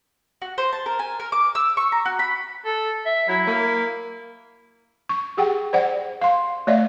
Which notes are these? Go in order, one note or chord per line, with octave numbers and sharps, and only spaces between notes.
F#4
C5
A5
A#4
G#5
A#4
D6
E6
C#6
A#5
F#4
B5
A4
E5
F#3 E4
A#3
C#6
G4 G#4 F#5 G5
C5 D5 F#5
F5 C6
A3 C#5 D5 E5